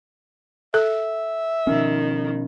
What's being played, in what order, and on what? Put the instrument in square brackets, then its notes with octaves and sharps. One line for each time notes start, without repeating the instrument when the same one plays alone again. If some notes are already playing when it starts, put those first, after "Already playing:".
[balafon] A4 [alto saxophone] E5
[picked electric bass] B2 F3 C#4 [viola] D#3